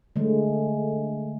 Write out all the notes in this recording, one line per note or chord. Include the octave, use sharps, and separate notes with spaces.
D3 G#3 A3